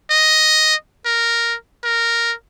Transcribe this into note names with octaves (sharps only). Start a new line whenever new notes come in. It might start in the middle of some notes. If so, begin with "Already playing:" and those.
D#5
A#4
A#4